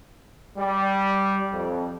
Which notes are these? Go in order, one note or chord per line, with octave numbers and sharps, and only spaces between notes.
G3
F2